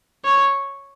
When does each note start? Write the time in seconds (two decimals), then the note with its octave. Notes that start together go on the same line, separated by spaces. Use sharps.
0.25 C#5